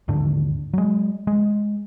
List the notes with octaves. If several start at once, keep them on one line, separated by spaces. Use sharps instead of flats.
D#2 G#2 D3
F#3 G#3
G#3